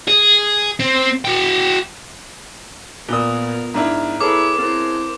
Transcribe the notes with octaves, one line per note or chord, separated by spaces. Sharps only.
G#4
C4
F#4 G5
A#2 B3 F4 A#4 D5 D#6
G#2 D4 E4 A#5 F6
E4 G#4 A4 B4 C#5 D6
C4 E4 A#4 C5